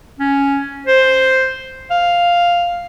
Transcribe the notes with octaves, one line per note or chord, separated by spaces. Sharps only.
C#4
C5
F5